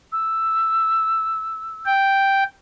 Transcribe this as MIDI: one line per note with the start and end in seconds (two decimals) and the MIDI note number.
0.12 1.92 88
1.86 2.44 79